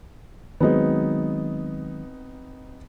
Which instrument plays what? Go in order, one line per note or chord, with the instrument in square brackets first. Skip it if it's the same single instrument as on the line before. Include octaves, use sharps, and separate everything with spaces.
[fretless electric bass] D#3 F#3 G#3 [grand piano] B3 C4 D#4